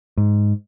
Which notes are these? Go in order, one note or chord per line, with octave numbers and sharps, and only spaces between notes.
G#2